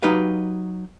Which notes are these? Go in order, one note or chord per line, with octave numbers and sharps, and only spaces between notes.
F#3 D#4 G4 B4 F5